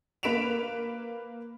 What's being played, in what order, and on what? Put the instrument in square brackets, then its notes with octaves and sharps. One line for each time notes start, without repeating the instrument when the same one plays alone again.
[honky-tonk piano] A#3 B4 B6 D7 E7 F7